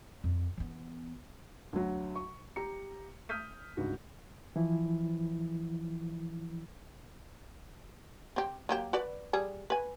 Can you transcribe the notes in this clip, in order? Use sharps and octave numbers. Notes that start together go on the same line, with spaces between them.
F2
E3 B3
D2 F#3
C#6
G4 A#5 C#7
D#6 F6 G6 B6 D#7
C#2 G2 D#4 F#4
E3 F3 E4
C4 G4
F#3 A#3 G4
F#4 B4 D5
G3 G#4
B4 G#5